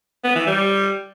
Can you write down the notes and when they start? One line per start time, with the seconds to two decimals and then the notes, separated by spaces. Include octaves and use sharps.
0.24 B3
0.36 E3
0.47 G3